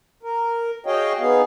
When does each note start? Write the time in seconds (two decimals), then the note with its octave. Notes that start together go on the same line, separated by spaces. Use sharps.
0.23 A#4
0.86 F#4 G#4 C#5 D#5 F5 G5
1.20 B3 D#4 G#4 F5